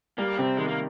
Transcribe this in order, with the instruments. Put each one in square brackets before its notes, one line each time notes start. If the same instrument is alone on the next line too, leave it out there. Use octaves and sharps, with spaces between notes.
[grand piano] G3 [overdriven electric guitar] A#3
[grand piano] C3 [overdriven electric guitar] C4
[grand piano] D#3 [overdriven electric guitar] G#3
[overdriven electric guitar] A#3